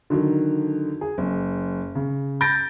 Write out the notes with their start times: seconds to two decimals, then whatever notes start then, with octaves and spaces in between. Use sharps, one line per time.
0.10 D3 D#3 F#3
1.01 G#4
1.18 F#1
1.95 C#3
2.41 G6 A6 A#6 D7